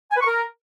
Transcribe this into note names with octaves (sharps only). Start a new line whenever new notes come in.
G#5
B4
C#6
A#4